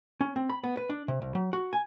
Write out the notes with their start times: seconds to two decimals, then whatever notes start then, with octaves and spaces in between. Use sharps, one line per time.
0.21 C#4
0.36 C4
0.49 B5
0.64 B3
0.77 B4
0.89 D4
1.08 C3
1.22 C2
1.35 F#3
1.53 F#4
1.73 G#5